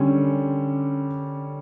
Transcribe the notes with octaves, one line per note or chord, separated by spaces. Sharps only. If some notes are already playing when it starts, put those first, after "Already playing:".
Already playing: D3 G3 C#4